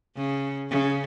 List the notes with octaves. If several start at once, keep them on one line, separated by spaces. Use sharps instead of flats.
C#3
C#3